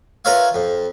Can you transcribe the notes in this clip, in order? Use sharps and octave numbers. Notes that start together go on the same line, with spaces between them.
F4 A#4 B4 C#5 E5 F5
F2